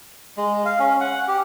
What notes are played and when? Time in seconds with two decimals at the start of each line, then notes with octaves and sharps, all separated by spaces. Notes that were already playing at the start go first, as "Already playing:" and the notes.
0.37 G#3
0.65 F5
0.80 C#4
1.00 F#5
1.28 G4